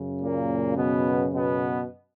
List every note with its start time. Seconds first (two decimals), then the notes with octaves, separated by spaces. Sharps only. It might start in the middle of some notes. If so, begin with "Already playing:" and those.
Already playing: F#2 C#3
0.22 A#2 A#3
0.77 B2 B3
1.33 B2 B3